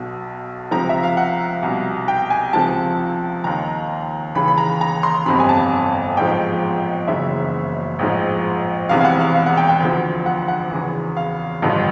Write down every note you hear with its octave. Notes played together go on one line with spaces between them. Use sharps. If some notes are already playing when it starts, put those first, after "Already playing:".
Already playing: B1 B2
C#2 C3 F3 A#5
E5
F5
F#5
C2 B2
G5
G#5
C#2 C3 F3 A5
D#2 D#3 A#5
D#2 C#3 E3 B5
B5
A#5
A#5
C6
G1 F2 C3 B5
G#5
A5
A1 G#2 F3 G5
F#1 F#2 C#3 E3 E5
A1 G#2 F3
E1 E2 C3 E3 F5
F5
F#5
F5
F5
F#5
G5
G5
D2 D3 F3
F#5
F#5
E2 C#3 E3
F5
A1 G2 D3 F3